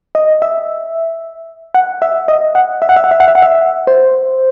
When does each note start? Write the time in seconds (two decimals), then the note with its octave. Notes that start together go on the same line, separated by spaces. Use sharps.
0.15 D#5
0.42 E5
1.74 F#5
2.02 E5
2.28 D#5
2.55 F#5
2.82 E5
2.89 F#5
2.96 E5
3.04 F#5
3.11 E5
3.20 F#5
3.28 E5
3.35 F#5
3.42 E5
3.87 C5